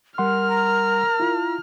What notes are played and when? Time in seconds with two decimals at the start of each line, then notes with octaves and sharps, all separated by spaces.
0.18 G3 A#4 F#5 C6 F6
0.50 A#5
1.20 E4 F4